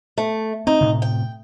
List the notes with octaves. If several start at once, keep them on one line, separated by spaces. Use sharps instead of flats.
A3
C4 D#4
A2 C3
G5